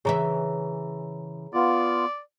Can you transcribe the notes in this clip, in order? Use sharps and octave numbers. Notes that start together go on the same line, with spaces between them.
C#3 E3 G#4 C#5 E5 A#5
B3 F4 D5